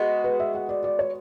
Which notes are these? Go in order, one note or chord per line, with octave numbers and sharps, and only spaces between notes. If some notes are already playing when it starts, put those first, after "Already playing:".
Already playing: G#3 B3 F#4
B4
E5
F#5
D5
D5
C#5